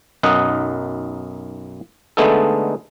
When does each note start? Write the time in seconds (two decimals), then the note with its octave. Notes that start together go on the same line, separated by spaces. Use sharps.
0.23 B1 F#2 D#4 D#5 F#5
2.17 D3 G#3 A3 B3 D#4 A4